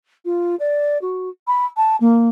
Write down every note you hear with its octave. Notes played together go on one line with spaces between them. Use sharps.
F4
D5
F#4
B5
A5
A#3